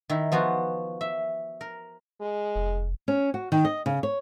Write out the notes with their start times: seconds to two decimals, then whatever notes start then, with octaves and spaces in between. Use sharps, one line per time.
0.10 D#3 E4
0.32 F3 B3 F4 F#4
1.01 E5
1.61 A#4
2.21 G#3
2.55 F1
3.08 C#4
3.34 F#4
3.52 D#3
3.65 D#5
3.86 C#3
4.03 C#5